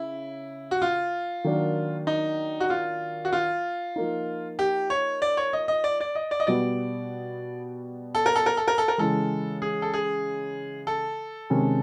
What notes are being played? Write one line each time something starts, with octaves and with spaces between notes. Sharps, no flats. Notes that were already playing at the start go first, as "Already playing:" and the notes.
Already playing: C#3 E4
F#4
F4
D#3 F#3 A#3 D4
D#4
F#4
F4
F#4
F4
F3 A#3 D#4
G4
C#5
D5
C#5
D#5
D#5
D5
D5
D#5
D5
D#5
B2 G3 B3 D5
A4
A#4
A4
A#4
A4
A#4
A4
A#4
C#3 E3 G#3 A4
G#4
A4
G#4
A4
C3 D#3 G#3 C#4